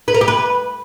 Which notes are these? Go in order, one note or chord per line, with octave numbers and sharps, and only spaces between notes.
B4
A#4
G4
B4